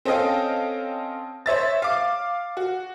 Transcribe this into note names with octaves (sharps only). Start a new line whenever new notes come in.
C4 C#4 A4 D#5 F5 G5
C5 C#5 E5 A6
F5 D6
F#4